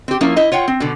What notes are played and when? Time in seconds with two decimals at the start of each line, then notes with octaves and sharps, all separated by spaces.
0.08 C4 G4
0.21 F3 A#3 C#4 E4 A#4
0.36 E4 D#5
0.52 F4 C#5 F#5 G5
0.68 C4
0.80 B2 D3